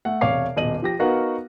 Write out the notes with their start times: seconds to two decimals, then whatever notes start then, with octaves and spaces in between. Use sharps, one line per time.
0.05 A3 F#5
0.21 E1 C3 C#5 F5 D6 C7
0.56 D#1 B2 D#5 D#7 F#7
0.82 F3 G4 A#6
0.99 B3 D#4 F#4 A#4 F5 F#5